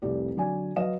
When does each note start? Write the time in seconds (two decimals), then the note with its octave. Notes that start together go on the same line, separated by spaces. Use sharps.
0.02 F1 C2 G4 D5
0.37 D3 F#3 D5 G#5
0.76 F#3 B4 D#5 F5 E7